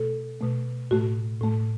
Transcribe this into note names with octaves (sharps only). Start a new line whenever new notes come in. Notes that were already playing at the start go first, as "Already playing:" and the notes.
Already playing: B2 A3 A4
B2 A3
A2 A3 F#4
A2 A3